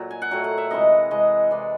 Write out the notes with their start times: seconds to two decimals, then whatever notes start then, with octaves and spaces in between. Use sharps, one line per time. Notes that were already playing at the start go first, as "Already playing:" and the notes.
Already playing: A#2 F#3
0.11 G#5
0.22 F#5
0.31 A#2 F#3 A3 G5
0.44 F#5
0.58 E5
0.71 C3 E3 G#3 D#5
1.11 C3 E3 G#3 D#5
1.51 C3 E3 G#3 D5